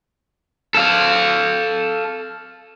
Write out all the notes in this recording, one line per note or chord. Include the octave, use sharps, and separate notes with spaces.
A4 F5